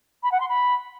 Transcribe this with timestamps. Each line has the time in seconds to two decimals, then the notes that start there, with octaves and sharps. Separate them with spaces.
0.23 B5
0.32 F#5
0.40 C6
0.49 B5